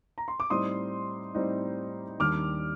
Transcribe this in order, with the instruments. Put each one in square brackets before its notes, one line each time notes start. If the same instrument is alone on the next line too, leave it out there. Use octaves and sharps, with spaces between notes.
[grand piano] A#5
C6
D6
A2 G3 C4 D#4 C6 D#6
A2 G3 C4 D#4
D#2 D#3 G3 D4 D6 F6